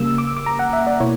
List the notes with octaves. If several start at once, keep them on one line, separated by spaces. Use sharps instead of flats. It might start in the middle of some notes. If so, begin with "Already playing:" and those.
Already playing: C#3 G3 A#3 E6
D6
E6
D6
A#5
F#5
E5
D5
B2 A#3 E4 C#5